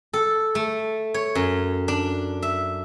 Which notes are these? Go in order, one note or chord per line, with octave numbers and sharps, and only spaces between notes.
A4
A3
C#5
F#2
D4
E5